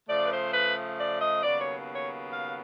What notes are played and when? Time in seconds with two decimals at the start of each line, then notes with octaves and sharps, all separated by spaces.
0.08 C#3 F3 A3 D5
0.26 B4
0.31 C5
0.54 B4
0.99 D5
1.21 D#5
1.43 D#2 C#3 F#3 B3 D5
1.60 C#5
1.94 C#5
2.33 F5